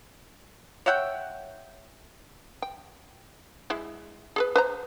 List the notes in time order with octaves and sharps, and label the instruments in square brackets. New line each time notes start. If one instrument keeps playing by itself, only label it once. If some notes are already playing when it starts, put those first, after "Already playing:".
[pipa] C#5 E5 F#5 G5
[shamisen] G5
G#3 E4
G#4 A4 B4
B4 C5 A#5